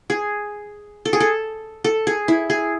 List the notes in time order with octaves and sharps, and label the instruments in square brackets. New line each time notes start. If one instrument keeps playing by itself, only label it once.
[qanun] G#4
A4
G#4
A4
A4
G#4
E4
G#4